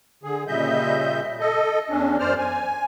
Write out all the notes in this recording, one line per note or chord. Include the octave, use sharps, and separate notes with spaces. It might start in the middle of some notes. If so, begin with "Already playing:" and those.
D3 G#4
A#2 C#3 G3 D#5 E5 G6
A4 D#5
E2 C#4 D4
F#2 C5 D5 F6
G#5